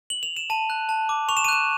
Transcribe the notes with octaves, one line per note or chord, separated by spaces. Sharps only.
F#7
F7
E7
A5 D#7
F#6
A5
D6
C#6 F7
E7
D#7
F#6 E7